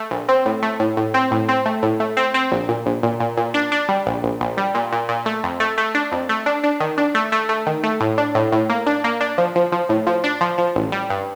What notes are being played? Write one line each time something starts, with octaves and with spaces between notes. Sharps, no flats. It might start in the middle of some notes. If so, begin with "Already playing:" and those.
Already playing: A3
A#1
C4
A2
A3
A2
A2
C4
A2
C4
A3
A2
A3
C4
C4
A#1
A#2
A#1
A#2
A#2
A#2
D4
D4
G3
A#1
A#1
A#1
G3
A#2
A#2
A#2
A3
F2
A3
A3
D4
F2
A3
D4
D4
D#3
D4
A3
A3
A3
D#3
A3
A2
D4
A2
A2
A#3
D4
A#3
D4
F3
F3
F3
A2
F3
D4
F3
F3
A1
G3
G2